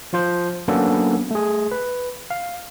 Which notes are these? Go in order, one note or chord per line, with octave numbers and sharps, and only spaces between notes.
F3 F4 C5
F#3 A#3 B3 C#4 D4 A4
A3 G#4
B4
F5